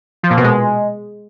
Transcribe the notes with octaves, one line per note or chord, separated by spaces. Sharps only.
F3
A#2
B2
G#3